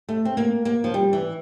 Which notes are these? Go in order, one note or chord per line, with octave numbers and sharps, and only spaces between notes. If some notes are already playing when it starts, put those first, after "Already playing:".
A3
C4
A#3
A#3
F3
G3
E3